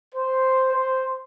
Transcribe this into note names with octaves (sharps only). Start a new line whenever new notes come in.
C5
C5